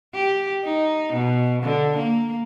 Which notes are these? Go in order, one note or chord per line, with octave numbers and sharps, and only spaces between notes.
G4
D#4
B2
D3
A#3